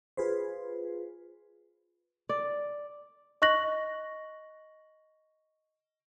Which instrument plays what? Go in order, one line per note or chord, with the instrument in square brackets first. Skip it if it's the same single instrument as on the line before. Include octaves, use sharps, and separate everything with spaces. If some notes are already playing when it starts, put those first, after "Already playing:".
[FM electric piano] F4 G#4 B4 C5
[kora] D5
[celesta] D#5 C#6 F#6 A#6 F#7